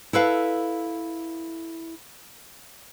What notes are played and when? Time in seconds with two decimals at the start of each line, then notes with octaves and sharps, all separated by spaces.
0.13 E4 A4 B4 F5